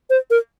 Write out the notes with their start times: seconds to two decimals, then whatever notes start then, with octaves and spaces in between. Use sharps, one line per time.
0.10 C5
0.31 A#4